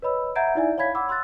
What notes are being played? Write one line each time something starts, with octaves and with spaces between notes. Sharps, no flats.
B4 C#5 D#5 B5 E6
E5 F#5 A#5 G6 G#6 D7
D#4 E4 D5 E5 G#5
C#5 F5 B5 G#6 B6
F#5 B5 D6 E6
C6 E6 F#6 A6